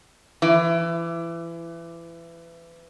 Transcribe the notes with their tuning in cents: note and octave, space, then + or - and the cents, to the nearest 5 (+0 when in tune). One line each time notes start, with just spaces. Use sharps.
E3 +25